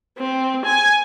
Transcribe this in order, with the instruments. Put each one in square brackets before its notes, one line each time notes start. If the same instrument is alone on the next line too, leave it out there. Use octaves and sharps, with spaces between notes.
[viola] C4
G#5